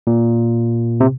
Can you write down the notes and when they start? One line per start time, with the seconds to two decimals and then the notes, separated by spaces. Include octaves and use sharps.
0.07 A#2
1.00 C3